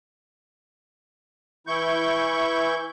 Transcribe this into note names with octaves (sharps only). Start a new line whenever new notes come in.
E3 E4 C#6 G6